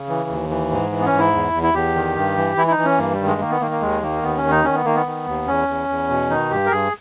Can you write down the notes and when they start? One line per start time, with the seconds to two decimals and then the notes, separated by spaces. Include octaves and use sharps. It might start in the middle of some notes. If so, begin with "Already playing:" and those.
Already playing: C#3
0.09 E3
0.29 D#2
0.50 E3
0.71 G#2
0.92 E3
1.00 B3
1.06 C#4
1.12 G#2
1.19 E4
1.33 E2
1.53 E2
1.63 E4
1.74 E2 G4
1.95 D#3
2.16 G2
2.37 E3
2.57 E3 E4
2.67 E4
2.71 D#4
2.78 E3
2.85 C#4
2.98 G2 A#3
3.13 G3
3.19 D#3
3.27 G#3
3.40 D#3 A#3
3.51 B3
3.61 D#3 A#3
3.71 A#3
3.81 D#2 G#3
4.02 D#3 A#3
4.23 D#2 B3
4.37 C#4
4.44 D#3
4.51 D#4
4.64 D#3 C#4
4.75 B3
4.85 D#3 A#3
4.96 B3
5.06 D#3
5.27 D#2
5.47 E2 C#4
5.68 E2
5.89 E2
6.10 B2
6.30 D#3 D#4
6.51 G2 G4
6.66 A#4
6.71 G2 G#4